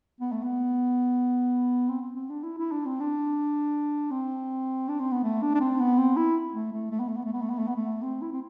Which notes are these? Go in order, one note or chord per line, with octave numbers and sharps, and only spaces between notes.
B3
A3
B3
C4
C4
C4
D4
E4
E4
D4
C4
D4
C4
D4
C4
B3
A3
D4
D4
C4
B3
C4
E4
A3
A3
A3
B3
A3
B3
A3
B3
A3
B3
A3
B3
A3
C4
E4
C4